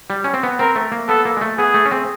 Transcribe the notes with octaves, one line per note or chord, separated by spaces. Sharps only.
G3
C#4
C4
B3
C4 A#4
A3
A#3
B3 A4
A#3
G#3
A3
B3 G#4
A3
C#4
C4